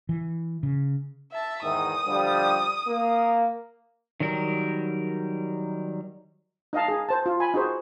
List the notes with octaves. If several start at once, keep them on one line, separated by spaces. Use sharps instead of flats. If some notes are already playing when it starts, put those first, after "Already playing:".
E3
C#3
E5 A5
E2 G#2 D#3 D#6
D3 F3 G3
A#3
D#3 F#3 G3 A#4
D#4 D#5 F5 A5
D#4 G#4
C5 A5
F4
G#5 B5
D#4 F#4 G#4 C5